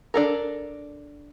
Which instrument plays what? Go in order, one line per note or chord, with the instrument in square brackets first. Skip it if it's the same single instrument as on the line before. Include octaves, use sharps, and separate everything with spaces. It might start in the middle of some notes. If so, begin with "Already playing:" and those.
[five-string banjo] D4 A4 A#4